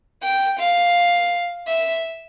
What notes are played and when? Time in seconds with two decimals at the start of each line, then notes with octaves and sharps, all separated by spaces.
0.23 G5
0.59 F5
1.67 E5